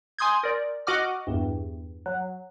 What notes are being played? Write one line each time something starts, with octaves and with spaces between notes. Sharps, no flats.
G#5 C6 D#6 G6 G#6
A#4 D5
F#4 D#5 F#5 D6 F6
E2 G2
F#3